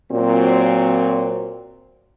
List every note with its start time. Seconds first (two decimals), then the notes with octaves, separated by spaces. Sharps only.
0.12 A#2 F#3 C4